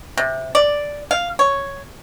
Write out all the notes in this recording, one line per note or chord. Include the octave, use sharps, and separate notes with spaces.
C3
D5
F5
C#5